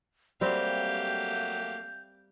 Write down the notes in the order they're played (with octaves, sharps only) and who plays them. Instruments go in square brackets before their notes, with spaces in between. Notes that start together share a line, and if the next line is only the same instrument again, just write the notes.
[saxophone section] F#3 A3 A#3 [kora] G3 C4 [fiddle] G4 F5 [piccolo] G6